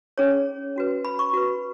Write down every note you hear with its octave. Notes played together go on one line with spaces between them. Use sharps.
C#4 G#4 C#5
C#4 F#4 B4
B5
C#6
F#4 B4